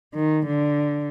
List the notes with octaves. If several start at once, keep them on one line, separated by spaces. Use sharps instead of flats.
D#3
D3